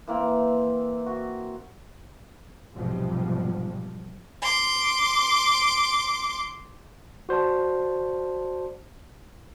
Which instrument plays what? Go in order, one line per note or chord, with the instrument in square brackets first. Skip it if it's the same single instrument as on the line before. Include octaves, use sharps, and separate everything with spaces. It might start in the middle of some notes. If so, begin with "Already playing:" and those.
[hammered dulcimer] E3 A#3 C4
F#4
[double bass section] F1 B1 G#2 C3 F3 G3
[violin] C6 D6
[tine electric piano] F#4 C5 D5 A5